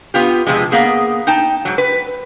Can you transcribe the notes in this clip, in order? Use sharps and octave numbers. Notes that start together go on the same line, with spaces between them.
B3 F4 G4
F2 C3 F3 G#3
A#3 B3 G#4
D#4 G5 A5
G#2 F#3
B4